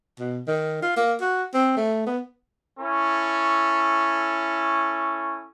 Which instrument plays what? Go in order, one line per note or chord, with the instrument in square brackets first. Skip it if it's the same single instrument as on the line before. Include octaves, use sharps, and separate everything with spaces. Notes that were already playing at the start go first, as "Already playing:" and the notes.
[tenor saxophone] B2
D#3
F4
A#3
F#4
C4
A3
B3
[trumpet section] C#4 E4 A4 C#6